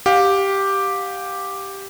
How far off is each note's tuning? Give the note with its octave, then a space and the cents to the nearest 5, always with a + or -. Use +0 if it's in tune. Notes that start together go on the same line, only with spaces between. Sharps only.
G4 +0 F5 +30